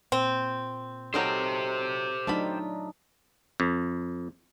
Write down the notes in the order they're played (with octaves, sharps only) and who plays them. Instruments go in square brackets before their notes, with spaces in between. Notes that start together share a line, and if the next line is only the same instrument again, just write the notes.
[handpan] A#2 [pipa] C4
[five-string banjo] F#3 D#4 A#4 [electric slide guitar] G4 C5 [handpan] A4
[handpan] F#3 D4 D#4 [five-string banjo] A3 F4 B5
[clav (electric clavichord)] F2